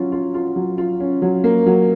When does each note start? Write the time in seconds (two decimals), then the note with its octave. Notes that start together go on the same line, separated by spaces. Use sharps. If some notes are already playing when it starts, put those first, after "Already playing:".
Already playing: F#3 C#4 F4
0.12 F4
0.34 F4
0.56 F#3
0.78 F4
1.00 C#4
1.22 F#3
1.44 A#3
1.66 F#3